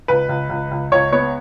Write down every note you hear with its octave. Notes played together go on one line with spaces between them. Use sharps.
C#2 B4
C#2
C#2
C#2
C#2 C#5
B3 C#5